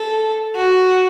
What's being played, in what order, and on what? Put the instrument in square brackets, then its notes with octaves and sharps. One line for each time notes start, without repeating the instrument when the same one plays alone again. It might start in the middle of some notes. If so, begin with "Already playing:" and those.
Already playing: [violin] A4
F#4